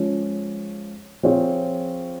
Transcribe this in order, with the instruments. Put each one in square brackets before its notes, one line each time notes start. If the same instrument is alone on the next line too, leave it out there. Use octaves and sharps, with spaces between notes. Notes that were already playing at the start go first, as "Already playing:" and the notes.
Already playing: [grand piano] F3 G#3 C#4
F3 C4 F4 G#4 C#5